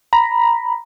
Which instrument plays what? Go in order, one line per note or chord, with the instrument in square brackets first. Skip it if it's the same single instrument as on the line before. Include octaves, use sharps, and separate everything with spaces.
[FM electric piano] A#5 B5